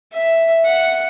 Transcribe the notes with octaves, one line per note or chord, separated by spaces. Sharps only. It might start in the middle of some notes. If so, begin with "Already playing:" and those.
E5
F#5